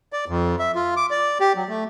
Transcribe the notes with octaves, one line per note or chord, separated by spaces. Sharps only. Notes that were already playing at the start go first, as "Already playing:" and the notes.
D5
F2
E5
F4
D6
D5
G4
F#3
A3